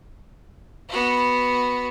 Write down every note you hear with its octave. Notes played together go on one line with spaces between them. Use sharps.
B3 F#4